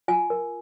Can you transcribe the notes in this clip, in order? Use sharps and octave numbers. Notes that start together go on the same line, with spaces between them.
F4 G#5
A#4